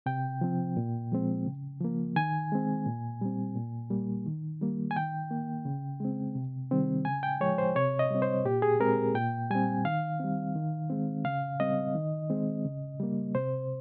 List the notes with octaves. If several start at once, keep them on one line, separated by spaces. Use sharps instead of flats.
C3 G5
F3 C4
A#2
F3 G#3 C4
C#3
F3 A#3
D#3 G#5
G#3 C4
A#2
G3 C4
A#2
G3 A#3
D#3
G3 A#3
G#5
D#3 G5
A#3
C#3
G#3 C4
C3
D#3 G3 C4
C#3 G#5
G5
F3 G#3 C#5
C5
C3 C#5
D#5
G3 C4
C5
A#2 G4
G#4
G#3 C4 A#4
A#2 G5
G3 C4 G#5
D#3 F5
G3 C4
D#3
G#3 C4
C#3 F5
G3 C4 D#5
D#3
G#3 C4
C#3
G3 A#3
C3 C5